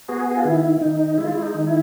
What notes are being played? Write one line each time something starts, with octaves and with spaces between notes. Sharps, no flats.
B3 F#4 G#4
F4
D#3 E4
D#3 D#4
G#3 E4
F4
E4
D#4
D#3
E4